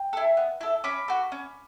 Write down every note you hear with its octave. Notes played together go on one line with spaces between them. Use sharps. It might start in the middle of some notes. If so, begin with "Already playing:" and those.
Already playing: G5
E4 A4
B3
E4 A4
C#4 B5 D6
F#4 A4
C#4